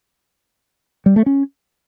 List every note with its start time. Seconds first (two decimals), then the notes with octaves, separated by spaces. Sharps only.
1.06 G3
1.16 A3
1.26 C#4